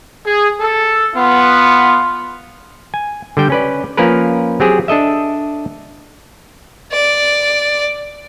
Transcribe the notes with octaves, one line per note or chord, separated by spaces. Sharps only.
G#4
A4
B3 F4
G#5
D3 G3 G5
C#4 B4 D5
F3 A#3 C#4 A#4 B4
F#3 C4 G4 G#4
D4 A4 D#5 E5
D5